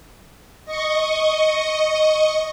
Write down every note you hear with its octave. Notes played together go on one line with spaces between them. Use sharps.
D#5 C#6